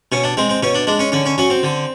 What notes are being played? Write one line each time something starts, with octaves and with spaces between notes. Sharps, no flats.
B2 C#4
D4
G#3 C4
C4
B2 C#4
D4
G#3 D4
C#4
D3 C#4
C#4
F#3 C#4
C4
D3